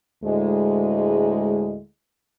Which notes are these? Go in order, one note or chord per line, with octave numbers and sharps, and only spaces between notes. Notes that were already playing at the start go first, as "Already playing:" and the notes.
D2 A2 G#3